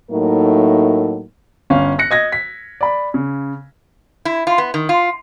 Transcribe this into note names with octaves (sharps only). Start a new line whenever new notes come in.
A2 F#3 A3 A#3 D#4 A#4
G1 C#4 F5
F#6 A#6 C#7
D#5 G#6 A#6
B6
D5 B5
C#3
E4
F4
B3
D#3
F4